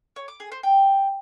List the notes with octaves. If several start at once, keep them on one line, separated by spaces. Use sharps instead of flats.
C#5
D6
G#4
C5
G5